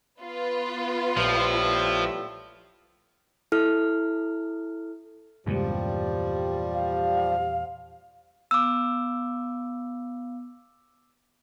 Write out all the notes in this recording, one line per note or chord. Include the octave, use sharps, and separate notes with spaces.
B3 F4 B4
A#1 A2 F3 G3 E5
E4 A4 F6
E2 G2 A#2 C#3 F3 G3 G#3
F5
B3 F5 D6 E6